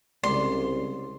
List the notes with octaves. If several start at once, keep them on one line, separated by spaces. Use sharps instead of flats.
C2 C#3 G#3 D5 C6